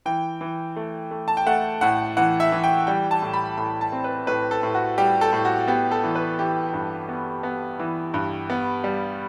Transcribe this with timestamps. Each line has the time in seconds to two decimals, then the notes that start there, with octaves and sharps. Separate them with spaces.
0.06 E3 G5
0.41 E3
0.76 A3
1.11 A3
1.28 A5
1.37 G5
1.46 A3 F#5
1.81 A2 F#5
2.17 E3 F#5
2.40 E5
2.52 E3
2.64 G5
2.87 G3 G5
3.11 A5
3.22 A2
3.33 B5
3.57 A2 B5
3.81 A5
3.92 C4
4.04 B4
4.27 A2 B4
4.51 A4
4.63 A2
4.75 F#4
4.98 G3 G4
5.21 A4
5.33 A2
5.45 F#4
5.68 B3 G4
5.91 A4
6.04 E3
6.15 B4
6.39 E3 G4
6.73 G2
7.09 B3
7.43 B3
7.79 E3
8.14 G2
8.50 B3
8.84 G3